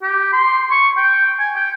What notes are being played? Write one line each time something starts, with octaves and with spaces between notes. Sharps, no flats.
G4
C6
C#6
G5
G#5
G5